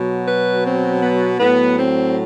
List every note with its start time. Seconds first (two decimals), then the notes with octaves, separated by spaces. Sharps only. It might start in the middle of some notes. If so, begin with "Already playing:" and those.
Already playing: B2 F#3
0.26 B4
0.64 C4
1.01 B3
1.39 A2 F#3 B3
1.77 C4